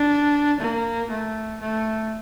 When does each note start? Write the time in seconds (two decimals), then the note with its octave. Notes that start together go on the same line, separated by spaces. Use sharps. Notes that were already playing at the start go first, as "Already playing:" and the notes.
Already playing: D4
0.61 A#3
1.11 A3
1.61 A3